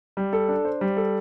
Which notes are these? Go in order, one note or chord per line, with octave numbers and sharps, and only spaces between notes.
G3
A4
D4
C5
G3
A4